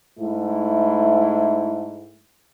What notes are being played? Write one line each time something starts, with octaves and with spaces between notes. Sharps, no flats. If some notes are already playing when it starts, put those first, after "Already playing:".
G#2 A3 E4